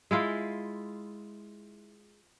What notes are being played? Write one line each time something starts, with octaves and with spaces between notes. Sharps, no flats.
G#3 E4 F4